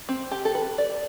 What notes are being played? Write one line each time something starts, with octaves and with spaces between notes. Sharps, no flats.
C4
G4
A4
B4
D5